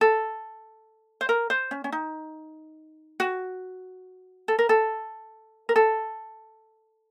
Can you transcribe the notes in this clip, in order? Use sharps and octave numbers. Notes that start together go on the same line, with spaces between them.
A4
C5
A#4
C5
C#4
C#4
D#4
F#4
A4
A#4
A4
A#4
A4